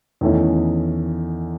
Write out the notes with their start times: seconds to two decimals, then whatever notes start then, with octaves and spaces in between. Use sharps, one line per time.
0.21 E2 D#3 A3 C#4 E4